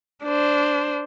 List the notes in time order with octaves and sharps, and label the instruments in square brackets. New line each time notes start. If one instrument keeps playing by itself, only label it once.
[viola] D4 C5